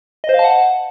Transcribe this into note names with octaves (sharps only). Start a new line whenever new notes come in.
D#5
C5
F5
A5
F#5